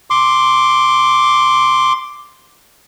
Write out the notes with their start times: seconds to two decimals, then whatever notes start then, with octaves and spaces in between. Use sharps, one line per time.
0.10 C6 D6